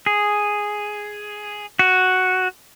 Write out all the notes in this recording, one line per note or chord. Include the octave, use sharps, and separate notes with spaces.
G#4
F#4